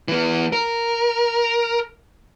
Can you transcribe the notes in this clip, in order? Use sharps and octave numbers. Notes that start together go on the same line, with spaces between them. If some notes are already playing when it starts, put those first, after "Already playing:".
E3 B3
A#4